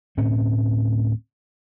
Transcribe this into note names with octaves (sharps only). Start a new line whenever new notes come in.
D2 A2 C4 C#4